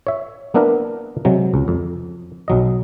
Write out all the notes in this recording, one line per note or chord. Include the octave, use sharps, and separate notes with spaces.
C#5 E5
A#3 B3 D4 E4 A#4 B4
C3 F#3 G#3
C#2
F2
B1 F#3 D#5